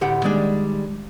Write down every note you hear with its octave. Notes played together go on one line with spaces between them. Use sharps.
D2 A2 G4 F#5
D#3 G3 G#3 D4